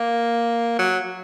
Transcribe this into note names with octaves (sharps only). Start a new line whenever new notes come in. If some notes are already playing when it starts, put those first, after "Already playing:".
Already playing: A#3
F#3